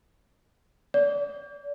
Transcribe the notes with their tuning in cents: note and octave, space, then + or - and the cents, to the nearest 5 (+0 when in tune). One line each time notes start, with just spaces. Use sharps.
D5 -35